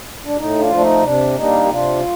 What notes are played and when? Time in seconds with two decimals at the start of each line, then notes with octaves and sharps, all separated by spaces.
0.25 D4
0.37 A2 D#4
0.59 D4 F4
0.70 F3 A3 D4
0.81 D#4
1.03 C3 D4
1.36 G3 A#3 D4 D#4
1.65 G4
1.69 C3 D4 F4